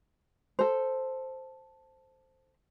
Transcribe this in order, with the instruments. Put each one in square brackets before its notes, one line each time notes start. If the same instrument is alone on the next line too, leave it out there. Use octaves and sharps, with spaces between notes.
[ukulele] A4 C5